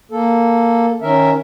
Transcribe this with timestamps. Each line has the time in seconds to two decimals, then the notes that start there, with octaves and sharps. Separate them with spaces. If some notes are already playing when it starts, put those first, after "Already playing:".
0.12 A#3 A4
1.02 D#3 C#4 A#4 E5